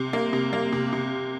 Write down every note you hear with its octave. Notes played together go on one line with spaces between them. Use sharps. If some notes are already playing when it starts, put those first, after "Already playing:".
Already playing: C3
A#3
C3
A#3
C3
C3